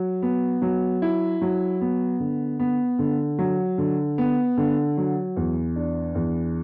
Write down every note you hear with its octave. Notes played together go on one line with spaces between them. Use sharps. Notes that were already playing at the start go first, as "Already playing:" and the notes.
Already playing: F#3
B3
F#3
E4
F#3
B3
D3
B3
D3
F#3
D3
B3
D3
F#3
E2
D4
E2